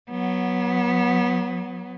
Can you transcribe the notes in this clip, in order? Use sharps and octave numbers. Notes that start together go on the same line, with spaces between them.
F#3 B3